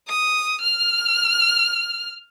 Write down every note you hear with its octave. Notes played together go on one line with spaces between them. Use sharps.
D#6
F6